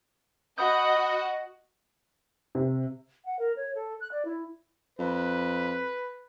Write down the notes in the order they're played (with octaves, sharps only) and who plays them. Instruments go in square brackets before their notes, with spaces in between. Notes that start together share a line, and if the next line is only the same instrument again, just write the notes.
[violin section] F#4 D#5 F#5 [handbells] B5 D#6 G6
[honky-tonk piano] C3
[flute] F#5
A#4
C#5
A4
F#6
D5
E4
[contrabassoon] F2 [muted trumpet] B4